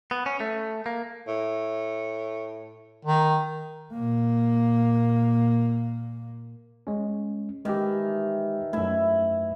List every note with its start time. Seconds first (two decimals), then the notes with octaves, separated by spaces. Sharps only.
0.11 B3
0.26 C#4
0.40 A3
0.86 A#3
1.28 A2
3.05 D#3
3.93 A#2 A#3
6.87 G#3 C#4
7.65 D#3 E3 G#3 G4 E5
8.73 F#2 A3 E4 E5